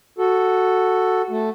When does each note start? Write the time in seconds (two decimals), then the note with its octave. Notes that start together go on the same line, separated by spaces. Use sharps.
0.19 F#4 A4
1.30 A3